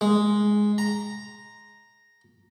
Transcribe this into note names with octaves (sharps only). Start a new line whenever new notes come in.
G#3
A#5